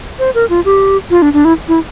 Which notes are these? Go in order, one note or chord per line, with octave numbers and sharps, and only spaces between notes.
C5
A#4
F4
G4
F4
D4
D4
E4
E4